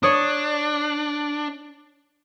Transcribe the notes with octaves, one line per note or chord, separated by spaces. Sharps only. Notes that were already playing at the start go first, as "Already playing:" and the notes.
D4 C#5 D#6